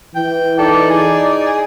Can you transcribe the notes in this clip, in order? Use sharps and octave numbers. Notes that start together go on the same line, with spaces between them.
E3 G5
D#4 A4 D5
G#4